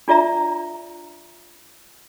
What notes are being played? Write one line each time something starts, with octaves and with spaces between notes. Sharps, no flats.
D4 F4 D5 E5 A#5